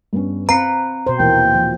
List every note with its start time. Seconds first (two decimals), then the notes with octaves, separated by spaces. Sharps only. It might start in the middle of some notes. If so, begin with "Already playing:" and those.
0.13 G2 B3 C#4
0.49 C4 B4 F5 A#5 C7 C#7
1.07 B2 C5
1.19 D#2 A#2 E3 A#3 G5
1.55 F3